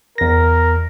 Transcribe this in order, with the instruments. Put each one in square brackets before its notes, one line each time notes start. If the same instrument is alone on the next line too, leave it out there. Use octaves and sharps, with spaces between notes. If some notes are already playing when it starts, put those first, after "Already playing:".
[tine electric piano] E2 A#6 [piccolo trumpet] A#4